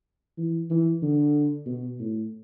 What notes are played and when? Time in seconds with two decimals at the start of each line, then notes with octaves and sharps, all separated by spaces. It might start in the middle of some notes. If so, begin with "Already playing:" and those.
0.38 E3
0.70 E3
1.02 D3
1.66 B2
1.99 A2